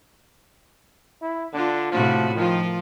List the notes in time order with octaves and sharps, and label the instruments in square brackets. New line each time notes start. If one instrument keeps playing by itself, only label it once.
[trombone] E4
[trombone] D3 [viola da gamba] D4 F4
[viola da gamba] A2 C3 F#4 [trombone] F3
[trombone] D#3 [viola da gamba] F3 F4